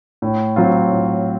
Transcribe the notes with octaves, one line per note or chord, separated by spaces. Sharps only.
A2
F#3 C4 F4
A2